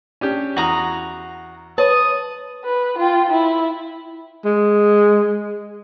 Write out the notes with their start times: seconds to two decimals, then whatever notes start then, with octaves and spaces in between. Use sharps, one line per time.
0.21 C#4 D4 G4
0.56 E2 F#4 A#5 D#6
1.78 B4 C#5 A5 D#6
2.65 B4
2.99 F4 G5
3.30 E4
4.45 G#3